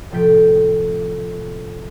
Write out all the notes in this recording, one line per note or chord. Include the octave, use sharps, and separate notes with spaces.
A2 C3 F3 G6 B6 D7